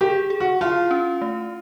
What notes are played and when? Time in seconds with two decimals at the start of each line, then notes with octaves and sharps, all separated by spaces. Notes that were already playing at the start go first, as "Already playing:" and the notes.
0.01 G4 G#4
0.30 G#4
0.40 F#4
0.61 E4 F4
0.91 C#4
1.22 A3